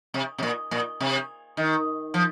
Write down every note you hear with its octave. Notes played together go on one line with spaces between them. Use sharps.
C3
C3
A#2
A#2
C3
D#3
F3